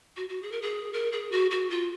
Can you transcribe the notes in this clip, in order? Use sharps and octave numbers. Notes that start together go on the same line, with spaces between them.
F#4
F#4
G#4
A#4
G#4
A#4
G#4
F#4
F#4
F4